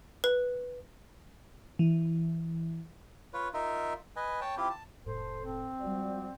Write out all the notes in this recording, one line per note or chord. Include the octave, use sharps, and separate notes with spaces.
B4
E3
F4 B4 C#5
D#4 F4 A#4 E5
B4 D#5 G#5
C#5 G5 A5
C4 E4 F4 G4
A5
F1 A2 A4 C5
C4
F3 G3 G#3 F#4 D5